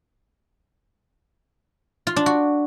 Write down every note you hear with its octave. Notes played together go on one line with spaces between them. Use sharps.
F4
D4
F#4